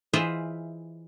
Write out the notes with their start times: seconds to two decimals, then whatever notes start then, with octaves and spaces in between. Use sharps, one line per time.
0.13 E3 F4 G#4 C5 D#5 E5